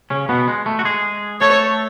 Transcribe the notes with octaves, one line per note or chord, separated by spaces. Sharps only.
C#3 C#4
B2 B3
G#3
A3
F#4
G#3 G#4
A3 A4 C#5